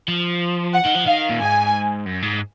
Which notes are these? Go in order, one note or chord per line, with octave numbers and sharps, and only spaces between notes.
F3
F#5
D#3
F3
D#3 F5
A#2
G#2 G#5
F#2
G#2